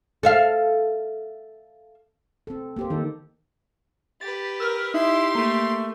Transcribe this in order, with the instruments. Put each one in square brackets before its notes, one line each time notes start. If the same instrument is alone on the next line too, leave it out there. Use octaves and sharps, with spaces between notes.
[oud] A4 E5 F5
[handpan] C4 A4
A#3 G4 C5
[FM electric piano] D#3 A#3 D#4 [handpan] A4
[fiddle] G4 B4 [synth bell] A6
[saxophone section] A#4 [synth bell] E6 F6
[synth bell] D#4 [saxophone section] E4 [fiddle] G4 C6
[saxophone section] A3 [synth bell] A#3